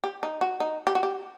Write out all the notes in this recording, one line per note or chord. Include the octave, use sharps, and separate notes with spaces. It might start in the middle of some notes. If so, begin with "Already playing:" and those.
G4
D#4
F#4
D#4
G4
F#4
G4